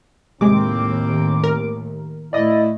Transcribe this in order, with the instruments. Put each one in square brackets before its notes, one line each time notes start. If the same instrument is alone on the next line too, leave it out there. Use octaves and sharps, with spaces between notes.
[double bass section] D#2 A2 [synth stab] C3 G#3 [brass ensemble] A#3 C4 [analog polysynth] D6
[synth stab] A#4
[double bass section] A2 A3 [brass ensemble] E4 [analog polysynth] D5 D#5